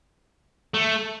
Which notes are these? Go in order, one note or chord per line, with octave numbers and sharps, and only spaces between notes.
A3